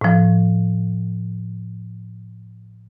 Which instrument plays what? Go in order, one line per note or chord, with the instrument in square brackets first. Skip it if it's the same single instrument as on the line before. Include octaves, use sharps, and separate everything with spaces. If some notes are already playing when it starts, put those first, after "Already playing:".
[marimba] A2 F3